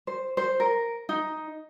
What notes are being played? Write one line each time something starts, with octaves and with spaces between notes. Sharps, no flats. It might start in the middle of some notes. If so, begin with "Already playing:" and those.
C5
C5
A#4
D#4